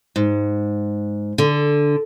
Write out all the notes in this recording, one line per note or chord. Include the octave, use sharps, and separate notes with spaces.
G#2
D3